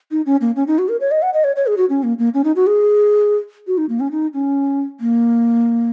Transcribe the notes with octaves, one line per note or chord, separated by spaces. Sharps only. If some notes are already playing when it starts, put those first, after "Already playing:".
D#4
C#4
A#3
C#4
D#4
F#4
A#4
C#5
D#5
F#5
D#5
C#5
C#5
G#4
F#4
C#4
A#3
A#3
C#4
D#4
F#4
G#4
F#4
D#4
A#3
C#4
D#4
C#4
A#3